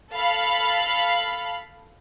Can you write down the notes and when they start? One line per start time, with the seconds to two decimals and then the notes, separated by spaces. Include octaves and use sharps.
0.14 A4 F5 B5